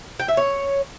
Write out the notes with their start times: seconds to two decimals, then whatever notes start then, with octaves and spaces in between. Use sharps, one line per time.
0.20 G5
0.28 E5
0.37 C#5